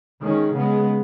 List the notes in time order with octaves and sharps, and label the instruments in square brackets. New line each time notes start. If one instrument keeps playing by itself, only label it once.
[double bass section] D#3 G#3 C#4
C#3 G#3 B3